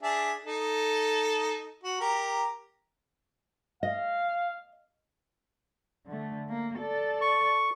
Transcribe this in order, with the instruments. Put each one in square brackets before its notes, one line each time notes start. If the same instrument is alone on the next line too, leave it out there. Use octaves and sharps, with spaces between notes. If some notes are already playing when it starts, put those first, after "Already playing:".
[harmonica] D4 G#4 E5
D#4 A4
F#4
G4 A#4 A#5
[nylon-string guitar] D#5 [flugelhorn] F5
[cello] D3 A3
A#3
A4 D5
[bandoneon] C#6